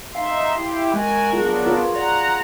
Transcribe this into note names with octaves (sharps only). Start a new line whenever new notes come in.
D#4 E5 F5 C6
E4 G4
G#3 F#4 A#4 G#5
F#3 B3 D4 F4 G#4
F4 F#4 A#4 C#5
D5 F#5 A#5